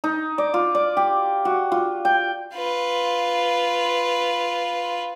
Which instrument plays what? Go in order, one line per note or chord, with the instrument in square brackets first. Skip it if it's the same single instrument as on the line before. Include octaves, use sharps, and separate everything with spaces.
[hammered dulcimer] D#4
D5
F4
D5
G4
F#4
F4
G5
[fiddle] F4 B4